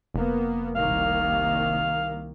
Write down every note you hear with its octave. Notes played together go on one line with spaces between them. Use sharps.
F1 A#3 B3
C2 D#3 A#3 F5